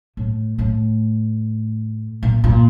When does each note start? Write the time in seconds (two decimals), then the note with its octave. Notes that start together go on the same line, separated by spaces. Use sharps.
0.17 A2
0.58 A2
2.23 A#2
2.44 A#2